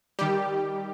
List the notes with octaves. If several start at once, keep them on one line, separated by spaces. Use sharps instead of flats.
D#3 G3 G4